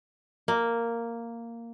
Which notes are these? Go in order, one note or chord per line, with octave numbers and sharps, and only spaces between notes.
A#3